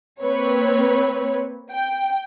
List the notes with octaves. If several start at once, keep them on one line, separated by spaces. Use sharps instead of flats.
A#3 C4 B4 C#5
G5